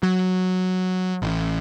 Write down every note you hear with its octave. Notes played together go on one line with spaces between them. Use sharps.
F#3
A1